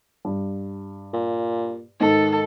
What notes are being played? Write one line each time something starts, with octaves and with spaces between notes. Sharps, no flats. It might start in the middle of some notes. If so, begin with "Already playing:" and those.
G2
A#2
G#2 D#3 A4